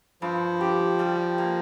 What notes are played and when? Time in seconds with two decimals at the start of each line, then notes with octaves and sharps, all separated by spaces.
0.22 G2 F3
0.61 G4
0.99 G3
1.38 A#3